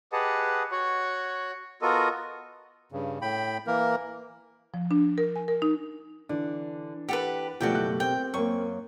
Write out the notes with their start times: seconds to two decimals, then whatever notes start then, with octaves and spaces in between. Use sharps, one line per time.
0.12 G4 G#4 B4 D#5 F#5 A5
0.71 F#4 C#5 F#5
1.82 B3 F4 F#4 A4 A#4 D#5
2.92 G2 C#3
3.22 A2 G5 B5
3.67 E3 A#3 A#4
4.74 F3
4.91 D4
5.18 A#4
5.36 G#5
5.48 A#4
5.62 D#4
6.29 D3 E3 D4
7.09 G4 A4 B4 F#5
7.60 B2 F3 A3 F#4 G4 A4 D5 G5
7.72 F#1 A3 F#6
8.00 C4 A#4 G5
8.34 F#2 A#3 C#6